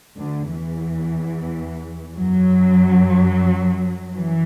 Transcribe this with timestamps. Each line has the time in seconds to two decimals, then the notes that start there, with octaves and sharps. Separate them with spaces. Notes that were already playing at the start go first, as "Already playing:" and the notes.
0.17 D2 D3
0.51 E2 E3
2.16 F#2 F#3
4.15 E3